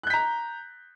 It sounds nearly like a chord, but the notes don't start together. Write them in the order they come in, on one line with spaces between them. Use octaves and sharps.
F#6 G6 B6 A#5